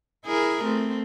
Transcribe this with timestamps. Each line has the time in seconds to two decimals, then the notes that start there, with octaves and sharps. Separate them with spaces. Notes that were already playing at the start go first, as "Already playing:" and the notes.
0.25 E4 G#4 A#4
0.65 A3 C4